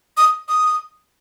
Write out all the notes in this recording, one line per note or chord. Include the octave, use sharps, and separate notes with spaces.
D#6
D#6